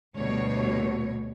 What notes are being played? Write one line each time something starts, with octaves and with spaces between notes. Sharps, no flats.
D2 B2 G3 C#5